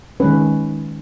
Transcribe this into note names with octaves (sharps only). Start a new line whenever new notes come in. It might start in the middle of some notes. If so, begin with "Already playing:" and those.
D#3 G#3 C#4 B4